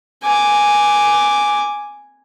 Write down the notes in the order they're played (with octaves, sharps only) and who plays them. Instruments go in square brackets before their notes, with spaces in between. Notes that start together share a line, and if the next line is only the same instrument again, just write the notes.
[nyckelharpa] G#5 D6